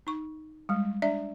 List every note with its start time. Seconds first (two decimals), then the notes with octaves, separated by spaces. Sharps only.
0.07 D#4 C#6
0.69 G3 G#3
1.02 D4 D5 E5